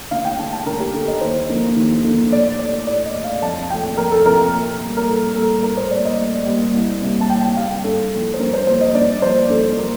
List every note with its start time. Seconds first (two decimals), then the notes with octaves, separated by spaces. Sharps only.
0.11 D2 F5
0.25 G5
0.39 D3 A3 A5
0.53 A5
0.66 D2 A#4
0.80 G4
0.94 D3 A4
0.97 A3
1.08 D#5
1.21 D#2 C5
1.49 D3 F3 A#3
1.77 D#2
2.04 D3 F3 A#3
2.32 A2 D5
2.59 A3 D5
2.87 A2 D5
3.06 D#5
3.15 A3
3.24 F5
3.42 F2 A5
3.70 C3 F3 A3 G5
3.97 F2 A#4
4.12 A4
4.25 C3 F3 A3 A#4
4.53 A#2
4.80 G3 A#3
4.97 A#4
5.08 A#2 A4
5.35 G3 A#3 A4
5.63 A2 A#4
5.77 C5
5.91 G3 A#3 D5
6.05 D#5
6.19 A2
6.46 G3 A#3
6.74 C2
7.02 C3 G3 A#3
7.21 A5
7.29 C2 G5
7.43 G5
7.57 C3 G3 A#3 F5
7.84 G2 A4
8.11 A#3 A4
8.16 F3
8.34 C5
8.39 G2 A#4
8.54 C5
8.67 F3 A#3 C5
8.81 D#5
8.95 G2 D5
9.22 F3 A#3 C5
9.50 G2 A4
9.77 F3 A#3 A#4